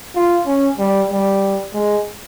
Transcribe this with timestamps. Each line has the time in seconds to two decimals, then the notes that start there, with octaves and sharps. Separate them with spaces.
0.16 F4
0.47 C#4
0.79 G3
1.11 G3
1.74 G#3